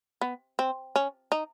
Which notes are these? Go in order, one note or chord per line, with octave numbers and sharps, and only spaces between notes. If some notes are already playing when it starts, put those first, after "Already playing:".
B3
C4
C#4
D#4